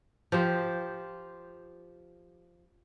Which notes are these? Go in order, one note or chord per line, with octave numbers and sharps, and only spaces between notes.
F3 G4 C5